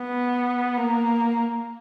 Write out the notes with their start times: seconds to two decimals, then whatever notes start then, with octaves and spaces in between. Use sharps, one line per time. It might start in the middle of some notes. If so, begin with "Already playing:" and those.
Already playing: B3
0.77 A#3